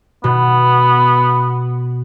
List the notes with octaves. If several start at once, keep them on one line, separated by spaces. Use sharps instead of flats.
B2 B3